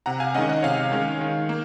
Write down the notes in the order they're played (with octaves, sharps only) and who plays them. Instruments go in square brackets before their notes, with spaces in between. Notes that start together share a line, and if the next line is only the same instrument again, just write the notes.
[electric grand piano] C3 F#5 A#5
F5 G#5
D#3 G#3 C#4 D#5 F#5
D#5 F#5
C3 C#5 F5
D#3 G#3 C#4
D#3
A#3